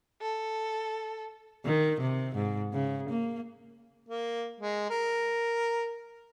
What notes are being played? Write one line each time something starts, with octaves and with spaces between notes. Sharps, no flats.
A4
D#3
C3
G#2
C#3
A#3
A#3
G#3
A#4